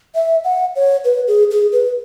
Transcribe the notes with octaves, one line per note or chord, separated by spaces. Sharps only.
E5
F#5
C#5
B4
G#4
G#4
B4